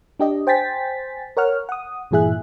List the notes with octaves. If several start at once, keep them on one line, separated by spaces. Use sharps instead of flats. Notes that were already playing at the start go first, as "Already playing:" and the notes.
D4 G4 D#5
C5 G5 G#5 A6 B6
A#4 C#5 F#5 F6
F#5 D#6
G2 A#2 E3 G#4 E5 F#6